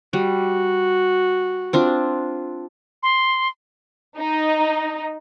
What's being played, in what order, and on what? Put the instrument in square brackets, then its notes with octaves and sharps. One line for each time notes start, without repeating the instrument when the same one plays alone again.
[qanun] G3 [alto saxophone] F#4
[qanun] C4 D4 F4
[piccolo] C6
[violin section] D#4